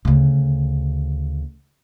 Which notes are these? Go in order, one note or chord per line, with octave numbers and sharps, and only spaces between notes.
D2 C#3